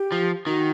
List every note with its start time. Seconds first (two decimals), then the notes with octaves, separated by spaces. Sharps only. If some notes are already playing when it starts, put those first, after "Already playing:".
Already playing: G4
0.12 F3
0.47 D#3 F#4